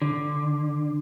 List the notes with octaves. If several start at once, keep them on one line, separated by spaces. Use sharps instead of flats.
D3